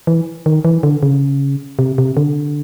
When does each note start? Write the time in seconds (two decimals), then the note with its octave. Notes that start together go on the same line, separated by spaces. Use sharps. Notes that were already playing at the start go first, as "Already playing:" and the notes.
0.07 E3
0.46 D#3
0.65 E3
0.83 D3
1.03 C#3
1.79 C3
1.98 C3
2.17 D3